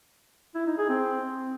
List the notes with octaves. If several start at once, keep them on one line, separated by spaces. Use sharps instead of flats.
E4
D#4
G#4
C4